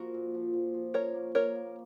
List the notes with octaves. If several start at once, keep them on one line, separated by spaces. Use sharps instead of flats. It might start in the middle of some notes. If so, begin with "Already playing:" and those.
Already playing: F3 A#3 F4 F#4 A#4
A#2
F3
A#2
F3
C#4 A#4 C#5
A#3
A#3 A#4 C#5
A#3